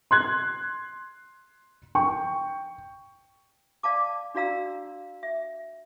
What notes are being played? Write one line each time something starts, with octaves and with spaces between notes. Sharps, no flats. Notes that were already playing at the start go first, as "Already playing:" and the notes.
C6 F#6 G#6
G5 C#6
D5 F5 A5 D6
D4 F#4 D5 F5 A#5 E6
E5